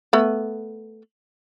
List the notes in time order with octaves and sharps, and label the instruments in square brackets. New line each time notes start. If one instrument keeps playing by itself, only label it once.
[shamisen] A3 B3